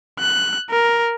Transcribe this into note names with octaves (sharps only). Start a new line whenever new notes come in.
F#6
A#4